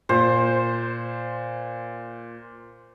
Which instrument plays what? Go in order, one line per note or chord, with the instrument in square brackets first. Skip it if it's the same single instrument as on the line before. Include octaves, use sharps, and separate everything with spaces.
[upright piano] A#2 [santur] C5